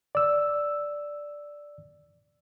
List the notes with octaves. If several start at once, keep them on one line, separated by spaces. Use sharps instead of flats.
D5 E6